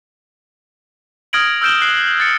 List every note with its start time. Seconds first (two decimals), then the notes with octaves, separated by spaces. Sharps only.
1.33 D#6 F6 G#6 A#6 D7 F#7
1.62 E6 F6 G6 D7 E7 G7
1.81 F#6 C7 F#7
2.20 A6 C#7